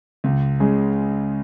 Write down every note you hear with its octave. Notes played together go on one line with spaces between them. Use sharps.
C#2
C#3 G#3